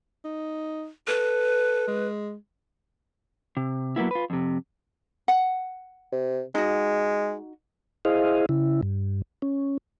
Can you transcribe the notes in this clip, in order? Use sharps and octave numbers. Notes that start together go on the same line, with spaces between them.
D#4
A4 B4
G#3
C3
F#3 A#3 B3 E4
F4 B4
F2 C3
F#5
C3
G#3 D#4 F#4
E4 G#4 C5 D#5 F5
C#3 E4
G2
C#4